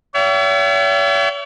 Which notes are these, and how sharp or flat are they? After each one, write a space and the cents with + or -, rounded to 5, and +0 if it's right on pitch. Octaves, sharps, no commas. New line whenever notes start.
C#5 +40 E5 +35 G5 -40